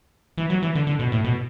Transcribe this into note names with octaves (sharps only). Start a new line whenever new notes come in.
E3
F#3
E3
D3
D3
B2
A2
B2